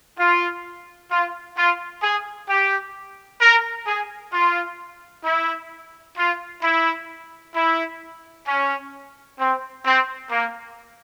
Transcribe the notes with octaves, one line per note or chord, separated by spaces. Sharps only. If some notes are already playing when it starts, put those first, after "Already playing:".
F4
F4
F4
G#4
G4
A#4
G#4
F4
E4
F4
E4
E4
C#4
C4
C4
A#3